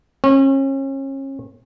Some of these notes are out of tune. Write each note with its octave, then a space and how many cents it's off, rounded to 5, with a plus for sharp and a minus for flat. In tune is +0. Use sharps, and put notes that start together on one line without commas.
C#4 -35